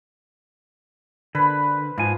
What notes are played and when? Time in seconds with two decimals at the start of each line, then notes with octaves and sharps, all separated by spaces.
1.35 D3 B4 C5
1.98 G#2 F3 G#5